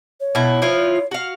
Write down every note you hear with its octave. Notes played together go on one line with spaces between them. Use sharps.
C#5
B2 E4
F3 E4 F4
F#4 F5